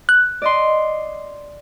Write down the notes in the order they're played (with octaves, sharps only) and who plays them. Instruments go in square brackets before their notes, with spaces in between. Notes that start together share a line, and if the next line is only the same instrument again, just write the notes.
[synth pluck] F#6
[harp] D5 D#5 C6